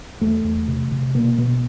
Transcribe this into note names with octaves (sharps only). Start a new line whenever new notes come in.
E2 A3
E2
C3
C3
B2 A#3
B2 B3